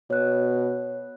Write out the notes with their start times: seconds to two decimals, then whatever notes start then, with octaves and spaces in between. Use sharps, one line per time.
0.10 B2 C#5 F#6